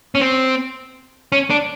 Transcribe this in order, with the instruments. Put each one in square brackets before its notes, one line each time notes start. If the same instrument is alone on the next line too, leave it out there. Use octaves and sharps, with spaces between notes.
[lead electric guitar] C#4
C4
C#4
D4